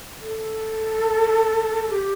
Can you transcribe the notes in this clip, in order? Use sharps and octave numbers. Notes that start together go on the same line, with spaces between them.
A4
G4